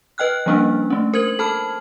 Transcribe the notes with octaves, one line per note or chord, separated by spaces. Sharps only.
B4 D#5 G5 F6 F#6
F3 G3 A#3 C#4 D4
A3 C#4
A#4 C5 G#6 F#7
A4 A5 B5 F6